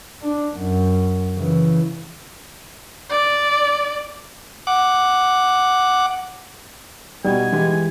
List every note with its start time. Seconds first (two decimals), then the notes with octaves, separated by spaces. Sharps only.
0.22 D4
0.57 F#2
1.36 C#3 E3
3.10 D5
4.67 F#5 D6
7.25 B2 G3 D#4 G#5
7.52 E3 G#3 G4